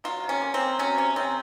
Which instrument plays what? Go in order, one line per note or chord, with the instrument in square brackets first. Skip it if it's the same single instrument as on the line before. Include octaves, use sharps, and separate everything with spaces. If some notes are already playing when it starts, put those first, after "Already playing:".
[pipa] F#3 F4
C3
C#4
A#3
C4
A#3
F#3 C#4
C3 C#4
C3 C4